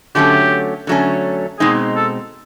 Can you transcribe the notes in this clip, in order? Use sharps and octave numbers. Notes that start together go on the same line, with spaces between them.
D3 F#3 A3 C#4 G4
D3 F#3 A3 C#4
B2 G#3 C4 D#4 G#4
A4